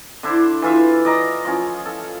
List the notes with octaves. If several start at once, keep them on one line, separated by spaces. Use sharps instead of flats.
D3 D4 E4 C5
E3 F4 E5
D5 D#5 A#5
F3 C#4
A4